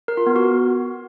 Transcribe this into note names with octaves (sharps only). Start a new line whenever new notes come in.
A#4
F4
B3
F#4